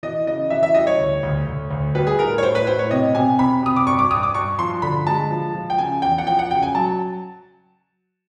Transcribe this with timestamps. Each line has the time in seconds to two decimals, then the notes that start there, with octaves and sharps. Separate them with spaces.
0.03 E3 D#5
0.27 C#3 D#5
0.50 E3 E5
0.63 E5
0.74 G3 D#5
0.87 C#5
0.99 D2
1.23 D2
1.47 D2
1.71 D2
1.95 G3 B4
2.07 G#4
2.18 A2 A#4
2.38 C#5
2.43 A2 C5
2.55 B4
2.67 A2 C5
2.79 C#5
2.91 C3 D#5
3.15 C3 G#5
3.39 C3 B5
3.63 C3 D#6
3.76 D6
3.87 G2 C#6
3.99 D6
4.10 G2 D#6
4.23 D6
4.35 G2 C#6
4.59 F3 C6
4.82 D3 B5
5.07 G#3 A5
5.31 F3
5.55 F3
5.70 G5
5.78 C#3 G#5
6.02 E2 G5
6.18 F#5
6.27 F3 G5
6.39 F#5
6.51 C#3 G5
6.63 G#5
6.75 F#3 A5